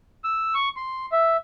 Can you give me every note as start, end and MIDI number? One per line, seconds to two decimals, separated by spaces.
0.24 0.54 88
0.54 0.69 85
0.76 1.06 84
1.12 1.37 76